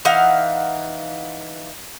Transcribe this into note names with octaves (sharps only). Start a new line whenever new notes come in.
E3 D#4 F5 F#5